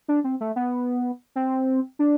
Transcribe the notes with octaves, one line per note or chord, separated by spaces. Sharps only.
D4
C4
A3
B3
C4
D4